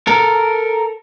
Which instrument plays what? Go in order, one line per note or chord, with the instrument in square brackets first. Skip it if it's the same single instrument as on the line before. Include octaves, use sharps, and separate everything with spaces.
[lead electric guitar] A4 A#4